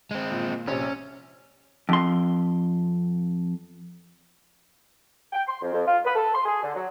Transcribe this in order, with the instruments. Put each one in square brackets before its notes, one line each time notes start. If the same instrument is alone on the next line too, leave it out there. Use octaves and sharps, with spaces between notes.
[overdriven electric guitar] G#3 C4
[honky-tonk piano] A#2
[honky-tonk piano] A#1 C3 [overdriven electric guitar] C#4
[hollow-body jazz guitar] F2 C6
[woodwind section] G5
C6
F2
F2
F4
B4
A4
C6
G#4
D3
F#3